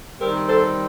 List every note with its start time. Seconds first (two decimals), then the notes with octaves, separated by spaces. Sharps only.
0.20 D#3 G3 C4 G4 A#4
0.49 A4 C5